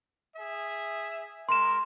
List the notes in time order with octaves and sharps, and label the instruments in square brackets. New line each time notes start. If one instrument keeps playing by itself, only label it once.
[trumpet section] G#4 E5
[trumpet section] G#3 A#4 [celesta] C6 E7